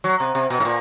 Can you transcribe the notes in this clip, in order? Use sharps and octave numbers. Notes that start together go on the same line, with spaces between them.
F#3
C3
C3
B2
A2
A#2